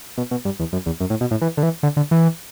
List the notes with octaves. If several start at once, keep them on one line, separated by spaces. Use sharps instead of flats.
B2
B2
G2
E2
F#2
E2
F#2
A2
B2
A2
E3
D3
E3
D3
D3
E3